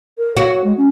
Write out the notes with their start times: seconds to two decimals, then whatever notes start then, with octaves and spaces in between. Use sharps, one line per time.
0.18 A#4
0.37 F#4 C#5
0.64 G#3
0.77 C#4